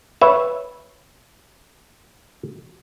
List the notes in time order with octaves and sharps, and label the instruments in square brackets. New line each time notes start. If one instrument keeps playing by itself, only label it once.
[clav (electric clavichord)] B4 C#5 E5